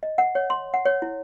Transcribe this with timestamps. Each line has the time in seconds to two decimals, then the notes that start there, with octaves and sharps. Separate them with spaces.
0.03 D#5
0.18 F#5
0.35 C#5
0.50 C6
0.74 F#5
0.85 C#5
1.02 E4